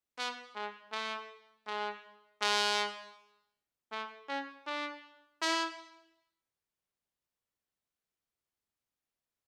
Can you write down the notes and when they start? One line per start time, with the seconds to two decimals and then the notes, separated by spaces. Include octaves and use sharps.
0.18 B3
0.55 G#3
0.92 A3
1.67 G#3
2.41 G#3
3.92 A3
4.29 C#4
4.67 D4
5.42 E4